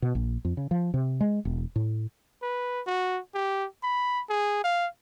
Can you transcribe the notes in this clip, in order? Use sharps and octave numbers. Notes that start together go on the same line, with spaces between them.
B2
A#1
F2
C#3
F3
C3
G#3
E1
A2
B4
F#4
G4
B5
G#4
F5